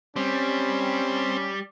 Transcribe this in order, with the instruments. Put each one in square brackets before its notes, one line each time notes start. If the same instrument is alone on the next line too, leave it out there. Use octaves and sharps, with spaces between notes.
[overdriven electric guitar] G3 [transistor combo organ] C4 [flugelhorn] C#4